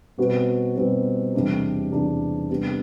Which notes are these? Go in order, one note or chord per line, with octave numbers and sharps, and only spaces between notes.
B2 G3 C4 F#4 B4
B2 G3 C4 F#4 B4
E2 C3 G3 D4
E2 C3 G3 D4
C3 G3 B3 D4 G4